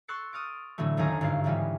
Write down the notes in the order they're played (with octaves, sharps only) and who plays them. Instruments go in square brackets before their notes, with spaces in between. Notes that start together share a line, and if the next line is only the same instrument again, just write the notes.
[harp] C6 C#6 E6 F#6 A6 C#7
D#6 F6 A6 D7
A2 D3 E3 F#3 A3
F#1 D#2 D#3 C#4 G#4 A#5
G#1 G2 D3 F4 C7
G#2 C#3 E3 G3 G#3 B3